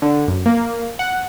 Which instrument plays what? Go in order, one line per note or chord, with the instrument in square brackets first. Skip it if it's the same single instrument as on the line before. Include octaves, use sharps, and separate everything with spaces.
[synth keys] D3
F#2
A#3
F#5